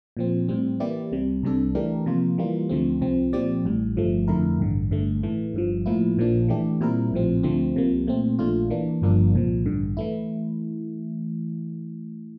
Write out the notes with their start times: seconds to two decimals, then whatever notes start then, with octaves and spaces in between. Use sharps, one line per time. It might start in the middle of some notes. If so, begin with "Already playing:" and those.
0.17 A#2 F3 C4
0.49 A2 G3 C4
0.80 E3 A#3 E4 G4 D5
1.12 C2 C3 G3
1.43 C2 C3 G3 D4 A4
1.75 E3 A3 D4 G4 A#4
2.06 C3 F3 A#3 F4
2.38 E3 G3 A#3 F4
2.69 D2 D3 F3 A3 C4
3.01 C2 C3 F3 C4
3.33 A#2 F3 C4 G4 D5
3.65 A1 A2 G3
3.96 G1 G2 F3 A3
4.28 F2 D3 A3 E4 A#4
4.59 A1 G2 D3
4.91 G1 G2 D3 A3
5.23 A2 E3 A3
5.54 G1 G2 F3
5.86 A2 F3 A#3 E4
6.17 A#1 A#2 F3 A#3 D4
6.48 E3 A3 D4 G4
6.81 A#2 G3 C4 E4 A#4
7.12 A#1 A2 F3 C4
7.43 D2 D3 F3 A3 C4
7.76 C2 C3 F3 A#3
8.07 A#2 A3 C4
8.39 A#1 A#2 A3 D4 F4
8.70 E3 A#3 D4
9.02 G1 G2 F3 A#3 D4
9.34 C2 A#2 F3
9.66 A1 G2 D3
9.97 E3 A3 E4